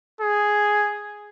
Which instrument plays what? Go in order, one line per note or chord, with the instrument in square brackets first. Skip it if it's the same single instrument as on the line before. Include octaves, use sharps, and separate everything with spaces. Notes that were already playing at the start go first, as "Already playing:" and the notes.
[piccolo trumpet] G#4